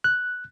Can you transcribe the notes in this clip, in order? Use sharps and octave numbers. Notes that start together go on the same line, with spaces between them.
F#6